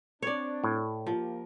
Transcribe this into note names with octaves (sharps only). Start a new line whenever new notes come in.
C4 D4 C#5 D5
A2
F3 A#3 G4 A#4